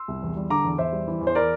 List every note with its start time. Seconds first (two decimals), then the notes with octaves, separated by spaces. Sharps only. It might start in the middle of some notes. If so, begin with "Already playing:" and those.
Already playing: C6 E6
0.08 C2
0.23 E2
0.37 G3
0.50 D3 A#5 D6
0.65 E2
0.78 E2 C5 E5
0.93 G3
1.08 E3
1.21 E2
1.27 C5
1.35 A#4 D5